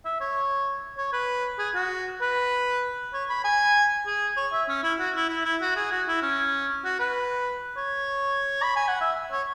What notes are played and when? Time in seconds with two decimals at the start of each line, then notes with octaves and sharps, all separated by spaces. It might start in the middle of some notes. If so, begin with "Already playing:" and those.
0.05 E5
0.21 C#5
0.97 C#5
1.13 B4
1.59 G#4
1.75 F#4
2.21 B4
3.13 C#5
3.29 B5
3.44 G#5
4.06 G#4
4.37 C#5
4.53 E5
4.69 C#4
4.83 E4
4.99 F#4
5.15 E4
5.29 E4
5.45 E4
5.61 F#4
5.76 G#4
5.92 F#4
6.08 E4
6.23 C#4
6.85 F#4
6.99 B4
7.77 C#5
8.63 B5
8.76 G#5
8.88 F#5
9.01 E5
9.32 C#5